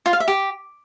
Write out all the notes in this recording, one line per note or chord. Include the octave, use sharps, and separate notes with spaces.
F4
F5
E5
G4